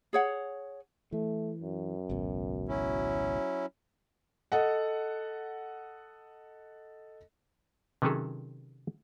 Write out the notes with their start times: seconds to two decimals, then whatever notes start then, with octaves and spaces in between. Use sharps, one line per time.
0.13 G#4 C#5 F#5
1.12 E3 A3
1.61 F#2
2.09 G#1 C#2 B2
2.69 F#3 C#4 E4
4.52 A4 D#5 F#5
8.02 C3 D#3 F#3 C#4 G#4 A4